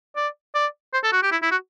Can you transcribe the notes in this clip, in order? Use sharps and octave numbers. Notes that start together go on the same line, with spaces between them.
D5
D5
C5
A4
F#4
G4
E4
E4
F#4